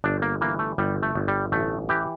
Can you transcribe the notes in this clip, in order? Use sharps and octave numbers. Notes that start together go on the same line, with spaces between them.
G1 D4
A#3
E3 A#3
A3
G1 G3
A3
G1
G3
A1 A3
E3 G4